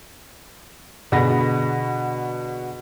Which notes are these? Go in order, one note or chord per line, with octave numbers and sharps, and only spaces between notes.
B2 D3 F#4 G#4 B5 A#6